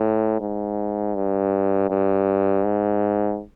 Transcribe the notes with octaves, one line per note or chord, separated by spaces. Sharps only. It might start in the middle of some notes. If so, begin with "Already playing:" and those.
Already playing: A2
G#2
G2
G2
G#2